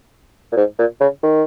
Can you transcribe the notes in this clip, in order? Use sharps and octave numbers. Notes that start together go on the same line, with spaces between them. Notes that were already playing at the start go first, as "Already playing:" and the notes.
A#2
G#2
A#2
C#3
D#3